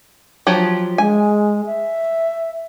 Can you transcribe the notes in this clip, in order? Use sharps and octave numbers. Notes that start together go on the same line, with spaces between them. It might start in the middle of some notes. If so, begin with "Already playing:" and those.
F3 F#3 G4
G#3 G#5
E5